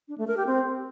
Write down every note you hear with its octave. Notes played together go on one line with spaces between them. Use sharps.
D4
A3
A#4
G4
C4